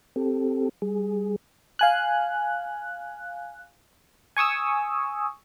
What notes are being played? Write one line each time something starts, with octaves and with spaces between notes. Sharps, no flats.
C4 G4 A4
G3 G#4
F5 G#5 F#6
G#5 C#6 D#6 E6